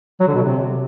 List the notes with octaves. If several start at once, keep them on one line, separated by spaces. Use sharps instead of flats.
F#3
D3
B2
C3